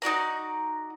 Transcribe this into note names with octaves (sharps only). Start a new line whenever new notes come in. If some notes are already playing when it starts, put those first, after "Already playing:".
D#4 F#4 D5 A#5